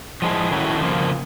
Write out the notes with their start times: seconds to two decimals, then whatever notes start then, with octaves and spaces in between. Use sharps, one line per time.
0.22 F3 G#3 B3 E4 G#4
0.51 D#3 F#3 A3 C#4 E4
0.81 C#3 F3 A#3